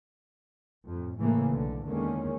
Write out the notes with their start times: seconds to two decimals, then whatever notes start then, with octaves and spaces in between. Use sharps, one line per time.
0.88 F2 A2
1.19 A2 C#3 E3 A3 A#3
1.51 B1 D3
1.85 E2 D3 D#3 G#3 A#3 C#4